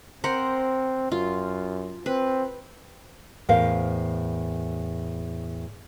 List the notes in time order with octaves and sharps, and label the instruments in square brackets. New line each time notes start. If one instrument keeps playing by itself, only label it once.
[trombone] C4 [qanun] A#4 C5 F#5
[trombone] F#2 [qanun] F4
[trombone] C4 [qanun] B4
[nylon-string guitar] E2 A2 A#4 C5 F5